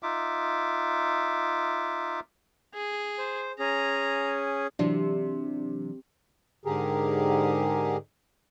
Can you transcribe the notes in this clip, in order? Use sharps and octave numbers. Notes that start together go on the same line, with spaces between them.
D#4 F4 E5 D6
G#4
C5
C#4 G#4 A#5
C3 E3 F#3 D4
G#2 D3 G4 G#4 A#4